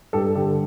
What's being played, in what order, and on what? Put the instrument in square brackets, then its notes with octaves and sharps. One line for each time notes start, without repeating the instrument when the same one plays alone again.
[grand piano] G2 G4 A4
D3 G4 A4